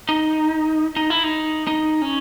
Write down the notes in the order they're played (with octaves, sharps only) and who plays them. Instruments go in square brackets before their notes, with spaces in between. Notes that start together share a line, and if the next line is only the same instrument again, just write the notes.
[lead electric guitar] D#4
D#4
E4
D#4
D#4
C#4